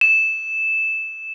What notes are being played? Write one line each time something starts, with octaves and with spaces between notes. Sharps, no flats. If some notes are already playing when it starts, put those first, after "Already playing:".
E7